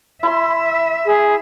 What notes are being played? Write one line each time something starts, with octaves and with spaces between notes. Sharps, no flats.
E4 E5 B5 C6
G#4